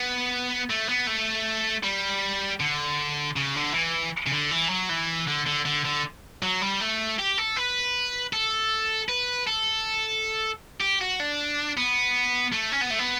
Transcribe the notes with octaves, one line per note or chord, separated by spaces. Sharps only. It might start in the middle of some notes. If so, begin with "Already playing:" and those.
Already playing: B3
A3
B3
A3
G3
D3
C#3
D3
E3
C#3
D3
E3
F#3
E3
D3
D3
D3
D3
F#3
G3
A3
G4
A4
B4
A4
B4
A4
G4
F#4
D4
B3
A3
C#4
B3
A3
B3